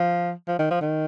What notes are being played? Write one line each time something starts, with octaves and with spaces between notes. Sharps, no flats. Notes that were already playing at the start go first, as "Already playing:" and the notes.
Already playing: F3
F3
D#3
F3
D#3